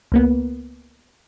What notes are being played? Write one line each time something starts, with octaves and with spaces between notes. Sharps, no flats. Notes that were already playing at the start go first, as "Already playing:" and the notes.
C#2 A#3 B3